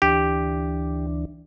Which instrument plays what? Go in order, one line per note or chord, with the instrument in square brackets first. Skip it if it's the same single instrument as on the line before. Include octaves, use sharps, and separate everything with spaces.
[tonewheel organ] D2 E3 D4 [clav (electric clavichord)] G4